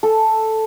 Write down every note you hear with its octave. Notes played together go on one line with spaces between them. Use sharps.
A4